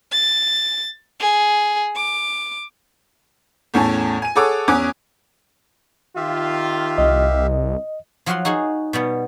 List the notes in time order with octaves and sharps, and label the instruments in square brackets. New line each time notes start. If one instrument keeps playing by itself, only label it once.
[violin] A6
G#4
D6
[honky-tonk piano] E2 A2 C#4 G#5 A5
G#5 D#7
G#4 A4 C#5 F#5 D6 E6
E2 C#4 G#5 D6 D#6 F#6
[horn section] D#3 F4 [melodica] G4 E5 F5
[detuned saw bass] C2 [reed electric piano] D#5
[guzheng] F3 F#3 F#4 F5 F#5 C6
D#4 F#4 G#4 C#5 F5
B2 G3 B3